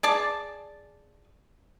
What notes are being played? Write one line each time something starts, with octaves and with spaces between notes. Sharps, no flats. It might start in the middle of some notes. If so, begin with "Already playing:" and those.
G#4 D5 A5